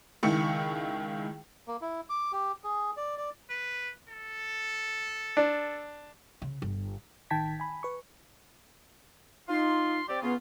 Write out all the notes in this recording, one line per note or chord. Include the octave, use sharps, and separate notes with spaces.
C#2 D#3 E4 C#6 C#7
A#3
E4
D6
G4
G#4
D5
D5
B4
A4
D4
C#3
G1
A1 D#3 G5 A5 G#6 B6
G#5 B5
B4 C#6
D#4 F4 C6
C4 G4 D5
C#3 B3 F4